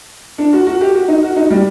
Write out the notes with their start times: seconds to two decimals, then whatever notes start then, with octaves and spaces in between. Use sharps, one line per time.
0.38 D4
0.53 F#4
0.67 F#4
0.81 G4
0.94 F#4
1.08 D#4
1.23 F#4
1.36 D#4
1.50 G3